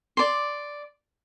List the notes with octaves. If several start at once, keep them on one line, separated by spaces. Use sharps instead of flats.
D5 C6